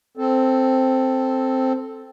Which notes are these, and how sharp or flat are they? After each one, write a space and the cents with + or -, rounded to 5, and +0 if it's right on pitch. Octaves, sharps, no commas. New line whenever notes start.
C4 +0 A4 +0